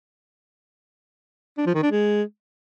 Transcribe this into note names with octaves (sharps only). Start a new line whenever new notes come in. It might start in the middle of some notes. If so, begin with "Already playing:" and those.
D4
F3
D#3
D4
G#3